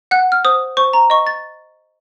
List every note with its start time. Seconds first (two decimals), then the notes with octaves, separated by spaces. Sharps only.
0.11 F#5 F#6
0.32 F6
0.45 C5 D#6
0.77 C5 C#6
0.93 A#5
1.10 D#5 C#6
1.27 A6